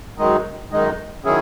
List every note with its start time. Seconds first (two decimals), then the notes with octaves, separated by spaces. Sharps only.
0.18 F#2 D#3 G#3 D#4
0.72 F#2 D#3 G#3 D#4
1.24 D#3 F#3 C#4 E4 G#4